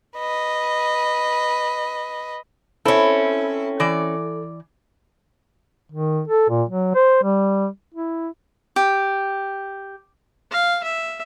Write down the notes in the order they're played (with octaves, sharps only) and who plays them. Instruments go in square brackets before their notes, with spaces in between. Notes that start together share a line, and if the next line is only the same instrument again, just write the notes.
[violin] B4 D#5
[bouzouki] C4 C#4 [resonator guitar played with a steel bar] E4 [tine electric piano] A4
[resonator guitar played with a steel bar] E3 D5
[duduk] D#3
A4
A#2
F#3
C5
G3
E4
[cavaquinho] G4
[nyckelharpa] F5
E5